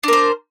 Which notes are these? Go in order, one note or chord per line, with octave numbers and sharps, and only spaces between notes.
D4 A#4 C5